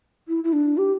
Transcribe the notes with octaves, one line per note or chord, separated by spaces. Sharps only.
E4
E4
D4
G4